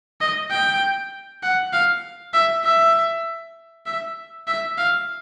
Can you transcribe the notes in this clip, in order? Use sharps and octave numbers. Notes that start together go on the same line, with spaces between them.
D#5
G5
F#5
F5
E5
E5
E5
E5
F5